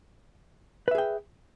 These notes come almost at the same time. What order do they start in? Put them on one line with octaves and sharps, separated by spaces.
B4 E5 G#4 G5